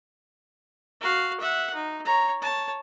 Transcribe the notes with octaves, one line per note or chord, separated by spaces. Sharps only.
F#4 F5
E5 F#5
D#4
C#5 A#5
C#5 A5